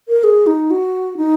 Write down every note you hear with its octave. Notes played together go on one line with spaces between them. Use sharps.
A#4
G#4
D#4
F#4
D#4